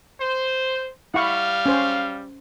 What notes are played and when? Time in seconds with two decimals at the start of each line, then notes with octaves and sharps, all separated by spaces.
0.19 C5
1.14 G3 E4 F5 F#5 C#6
1.66 C#4 C5